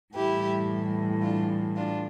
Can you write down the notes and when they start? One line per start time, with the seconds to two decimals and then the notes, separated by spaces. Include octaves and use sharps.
0.14 A2 E3 G3 E4 G4
1.22 D4 F4
1.76 D4 F4